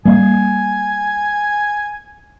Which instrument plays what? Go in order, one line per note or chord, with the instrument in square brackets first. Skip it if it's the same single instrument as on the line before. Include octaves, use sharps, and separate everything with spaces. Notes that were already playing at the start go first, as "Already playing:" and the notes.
[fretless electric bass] G3 A#3 [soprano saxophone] G#5